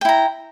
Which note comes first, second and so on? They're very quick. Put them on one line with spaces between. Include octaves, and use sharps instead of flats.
G5 E4 A#5